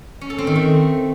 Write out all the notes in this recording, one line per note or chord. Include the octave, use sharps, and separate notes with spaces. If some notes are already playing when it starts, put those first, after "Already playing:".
C#4
A4
C4
D#3
A3